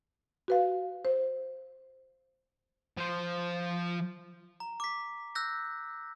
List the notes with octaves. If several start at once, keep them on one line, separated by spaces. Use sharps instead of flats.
F#4 B4 F5
C5
F3 C5
A#5
D6 B6
E6 F#6 G6 A#6